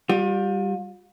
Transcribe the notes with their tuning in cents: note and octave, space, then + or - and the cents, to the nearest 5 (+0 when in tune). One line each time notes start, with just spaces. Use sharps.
G3 +0 F4 +40